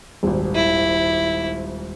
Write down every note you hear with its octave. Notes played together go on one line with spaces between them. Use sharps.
D#1 G#1
E4